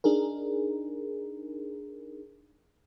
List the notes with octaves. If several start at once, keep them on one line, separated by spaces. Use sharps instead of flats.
D4 D#4 G#4 A#4